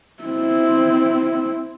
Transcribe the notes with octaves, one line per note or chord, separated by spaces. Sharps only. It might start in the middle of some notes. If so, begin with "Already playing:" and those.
C4 E4